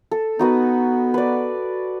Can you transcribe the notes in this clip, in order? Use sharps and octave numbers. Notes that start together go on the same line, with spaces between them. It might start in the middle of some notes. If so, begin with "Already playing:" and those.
A4
B3 D#4 F#4 B4
B4 D5